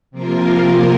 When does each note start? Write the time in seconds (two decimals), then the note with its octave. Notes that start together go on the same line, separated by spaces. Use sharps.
0.11 C3 F3 A#3 F4 A#4